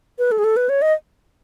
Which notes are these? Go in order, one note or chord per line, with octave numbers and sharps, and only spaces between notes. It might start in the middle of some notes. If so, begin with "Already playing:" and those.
B4
A4
G#4
A4
B4
C#5
D#5